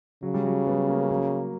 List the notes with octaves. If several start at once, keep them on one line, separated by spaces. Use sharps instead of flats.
C#3 F#3
G3
F#3
G3 B3
A#3 C#4
F#3 A#3